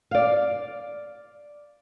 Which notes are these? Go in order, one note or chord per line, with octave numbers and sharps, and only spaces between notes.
D5 F5